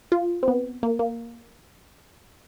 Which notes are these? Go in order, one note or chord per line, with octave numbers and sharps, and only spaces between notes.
F4
C4
B3
A#3
A#3